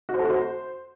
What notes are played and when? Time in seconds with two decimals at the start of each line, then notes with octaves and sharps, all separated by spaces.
0.09 F#4
0.14 C5
0.19 A4
0.25 F#4
0.30 C5